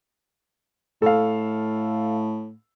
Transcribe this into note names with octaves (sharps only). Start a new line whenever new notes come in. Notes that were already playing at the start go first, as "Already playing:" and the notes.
A2 A4 F5